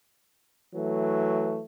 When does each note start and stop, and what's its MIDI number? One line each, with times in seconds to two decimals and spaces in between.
0.75 1.62 52
0.75 1.62 54
0.75 1.62 57